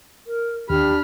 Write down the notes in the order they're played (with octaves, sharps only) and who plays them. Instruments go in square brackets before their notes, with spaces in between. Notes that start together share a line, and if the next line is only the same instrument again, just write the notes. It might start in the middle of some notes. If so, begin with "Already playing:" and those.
[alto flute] A#4
[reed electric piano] D#2 [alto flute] D4 [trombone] G4 [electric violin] B5 F6